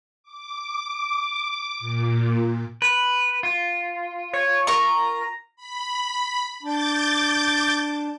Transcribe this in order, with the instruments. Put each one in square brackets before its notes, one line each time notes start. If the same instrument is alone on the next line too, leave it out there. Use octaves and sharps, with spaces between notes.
[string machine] D6
A#2
[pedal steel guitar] B4
F4
[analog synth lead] C#5
[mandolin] A#4 C#6 [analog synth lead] A#5
[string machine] B5
[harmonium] D4 [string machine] D6 G6 A6